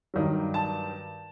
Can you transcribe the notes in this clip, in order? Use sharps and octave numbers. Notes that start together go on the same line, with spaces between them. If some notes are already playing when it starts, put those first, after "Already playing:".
G2 D#3 F#3
A5